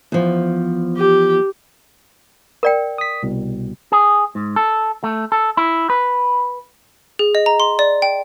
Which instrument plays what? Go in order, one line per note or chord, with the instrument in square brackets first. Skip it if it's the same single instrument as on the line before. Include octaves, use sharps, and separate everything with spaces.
[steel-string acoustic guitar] E2 F3
[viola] G4
[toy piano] A#4 D5 G5
[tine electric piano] D#6 B6
C2 B2
[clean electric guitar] G#4
G#2
A4
A3
A4
E4
B4
[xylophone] G#4
D#5
A#5
C6
D5
G5